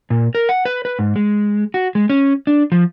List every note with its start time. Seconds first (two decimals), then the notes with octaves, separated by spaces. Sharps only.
0.10 A#2
0.35 A#4
0.49 F#5
0.65 B4
0.85 B4
0.99 G#2
1.16 G#3
1.74 F#4
1.95 G#3
2.10 C#4
2.47 D4
2.72 F3